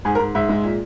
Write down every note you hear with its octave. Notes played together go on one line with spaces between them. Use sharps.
G#2 G#4
A#4
G#2
G#2 E5
G#3
A#2